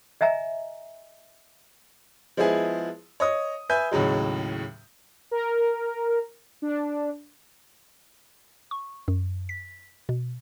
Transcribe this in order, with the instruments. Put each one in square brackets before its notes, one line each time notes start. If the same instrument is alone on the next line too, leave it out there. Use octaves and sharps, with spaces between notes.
[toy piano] D#5 E5 G#5 A#5
[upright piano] F3 G#3 B3 E4 G#4
C#5 D#5 D#6
B4 E5 G#5 G6
D#2 A2 C#3 F#3 G#3
[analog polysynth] A#4
D4
[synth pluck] C#6
F#2
B6
B2